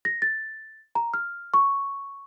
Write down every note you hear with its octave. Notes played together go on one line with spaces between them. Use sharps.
A#6
A6
A#5
F6
C#6